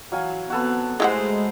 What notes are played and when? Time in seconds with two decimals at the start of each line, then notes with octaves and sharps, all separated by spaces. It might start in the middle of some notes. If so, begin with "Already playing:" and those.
0.12 E3 F#3 F5 G#5
0.50 B3 C4 F#4 A4 B4
1.00 G#3 A3 E4 G4 C5 F#5